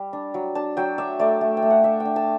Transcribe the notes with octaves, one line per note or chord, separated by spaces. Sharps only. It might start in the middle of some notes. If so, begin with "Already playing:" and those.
Already playing: G3 D5
D4
F#3
D4 A5
F#3 G5
D4 E5
A3 D5
A3
G5
A3
F#5
D4 E5
G5
D4
A5